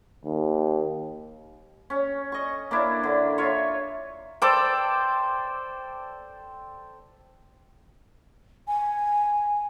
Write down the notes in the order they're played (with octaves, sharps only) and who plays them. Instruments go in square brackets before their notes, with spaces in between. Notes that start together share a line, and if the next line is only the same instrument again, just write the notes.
[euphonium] D#2
[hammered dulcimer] C#4
D#5 C#6
A#3 D4 E4
D3
F4 C#5 E5
A4 C5 D5 G5
[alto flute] G#5